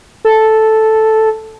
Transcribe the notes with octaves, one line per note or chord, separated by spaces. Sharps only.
A4